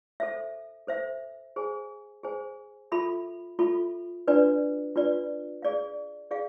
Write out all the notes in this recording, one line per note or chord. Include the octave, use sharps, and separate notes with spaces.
A4 C5 E5
A4 C5 E5
G#4 C5 G#5
G#4 C5 G#5
F4 A4 E5 B5
F4 A4 E5 B5
D4 F4 B4 D5
D4 F4 B4 D5
G#4 D5 F5
G#4 D5 F5